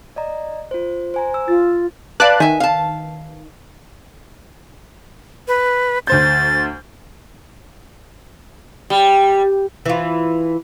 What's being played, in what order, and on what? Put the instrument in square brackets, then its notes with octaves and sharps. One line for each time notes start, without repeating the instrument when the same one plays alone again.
[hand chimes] D5 D#5 A#5
F4 C5
C5 G#5 A#5
E6
[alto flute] F4 [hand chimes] A6
[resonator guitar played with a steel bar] B4 F5 [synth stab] D5 A5 F#6
[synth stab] D#3 [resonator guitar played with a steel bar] E5 G#5
[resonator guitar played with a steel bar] F5 A5
[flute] B4
[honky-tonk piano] D2 C5 G6 [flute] A6
[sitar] G3 [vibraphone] G5
[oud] E3 F4